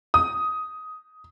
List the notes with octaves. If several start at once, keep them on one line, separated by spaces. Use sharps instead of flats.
D#6